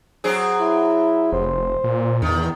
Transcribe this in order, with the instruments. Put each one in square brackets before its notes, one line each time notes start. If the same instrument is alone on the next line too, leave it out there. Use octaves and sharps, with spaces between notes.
[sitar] F#3 C4 G#4
[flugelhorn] E4
[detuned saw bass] F1 [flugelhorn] C5
[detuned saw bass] A#2
[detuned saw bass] E2 [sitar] D#3